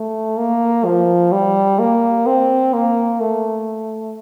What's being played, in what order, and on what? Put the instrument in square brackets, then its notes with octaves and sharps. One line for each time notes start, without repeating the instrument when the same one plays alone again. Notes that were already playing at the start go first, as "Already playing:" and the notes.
Already playing: [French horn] A3
A#3
F3
G3
A#3
C4
A#3
A3